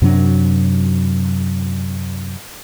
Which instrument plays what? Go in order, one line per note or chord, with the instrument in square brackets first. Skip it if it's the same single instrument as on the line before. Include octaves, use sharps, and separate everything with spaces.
[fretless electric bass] F#2 C3 F#3 D4